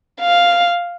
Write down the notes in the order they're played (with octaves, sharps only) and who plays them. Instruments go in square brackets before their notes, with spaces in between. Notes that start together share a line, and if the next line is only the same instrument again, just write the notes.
[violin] F5